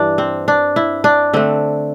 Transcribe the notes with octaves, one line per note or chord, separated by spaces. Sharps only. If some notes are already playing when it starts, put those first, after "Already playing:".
Already playing: G2 E3 D4
C4
D4
E4
D4
D3 A3 C4